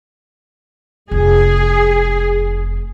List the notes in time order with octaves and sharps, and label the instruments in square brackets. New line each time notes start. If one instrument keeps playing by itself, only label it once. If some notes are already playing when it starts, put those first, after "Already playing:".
[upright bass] F1 [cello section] G#4